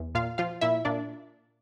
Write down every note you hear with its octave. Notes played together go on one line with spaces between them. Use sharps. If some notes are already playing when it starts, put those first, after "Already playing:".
Already playing: E2
A#2 F4 F5
F3 F4 F5
A#2 E4 E5
A#2 D4 D5